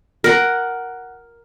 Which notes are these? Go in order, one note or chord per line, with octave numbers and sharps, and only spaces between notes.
A#4 F#5